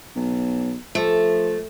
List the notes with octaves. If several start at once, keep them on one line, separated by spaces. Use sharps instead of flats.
B1
F3 A3